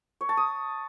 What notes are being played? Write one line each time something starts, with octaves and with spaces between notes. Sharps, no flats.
C#5
A5
D#6